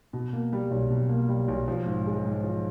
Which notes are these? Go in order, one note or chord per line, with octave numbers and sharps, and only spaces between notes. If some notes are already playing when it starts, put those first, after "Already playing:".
B2
A#3
G3
B1
B2
A#3
G3
B1
F3
G#2
G#3
G#2
F3